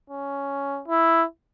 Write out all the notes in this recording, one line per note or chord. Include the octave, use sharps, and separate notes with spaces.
C#4
E4